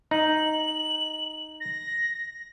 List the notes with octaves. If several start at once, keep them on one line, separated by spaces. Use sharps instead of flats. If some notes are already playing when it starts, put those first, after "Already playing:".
D#4 F#7
A#6